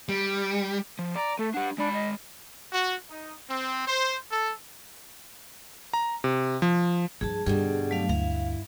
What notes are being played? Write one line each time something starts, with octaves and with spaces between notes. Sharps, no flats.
G3
F3
D5 A#5
A3 A4
D4 G4 F#5
G#3 D4 B5
D#5
F#4
D#4
C4
C5
A4
A#5
C3
F3
G2 F3 G#4 A5
G2 B2 D3 G3 G#4
F#3 A3 F5
D2 E4 F5